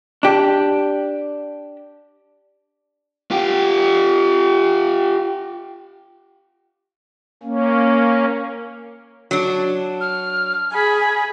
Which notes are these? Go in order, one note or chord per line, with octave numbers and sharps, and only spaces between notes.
D4 G4
F4 G4
A#3 C#4
F#3 D4
F6
G#4 B5